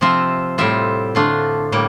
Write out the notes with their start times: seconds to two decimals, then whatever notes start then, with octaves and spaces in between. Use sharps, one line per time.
0.01 C3 F3 C4 F4 E5
0.58 A2 G3 C4 F4 E5
1.15 D3 A3 D4 F4
1.72 A2 G3 A#3